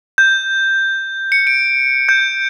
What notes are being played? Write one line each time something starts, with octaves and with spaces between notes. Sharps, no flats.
G6
C#7
D7
G6